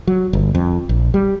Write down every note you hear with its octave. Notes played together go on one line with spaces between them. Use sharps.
F#3
G1
F2
A#1
G3